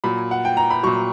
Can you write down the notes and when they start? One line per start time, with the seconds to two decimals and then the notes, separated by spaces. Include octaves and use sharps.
0.04 A#2 F#3 B5
0.31 F#5
0.45 G5
0.57 A#5
0.71 B5
0.83 A#2 F#3 C#6